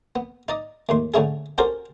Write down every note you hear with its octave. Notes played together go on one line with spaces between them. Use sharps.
B3
D#4 D5 D#5
D#2 A2 C6
A2 D3 C#4 E4 G#4
C#4 F#4 G4 A4 A#4 C5